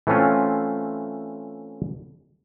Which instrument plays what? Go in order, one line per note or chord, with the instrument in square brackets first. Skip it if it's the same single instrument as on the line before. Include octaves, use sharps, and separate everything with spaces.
[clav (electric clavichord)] E3 A3 C4 C#4 F4